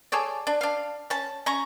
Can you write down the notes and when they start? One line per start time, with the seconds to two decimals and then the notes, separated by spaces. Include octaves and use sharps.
0.12 G#4 A4 C#5 D5
0.47 D4
0.61 D4 F5
1.10 C#4 A5
1.46 C#4 A#5 C#6